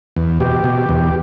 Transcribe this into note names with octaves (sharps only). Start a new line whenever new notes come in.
E2
B2 G4
B2
E2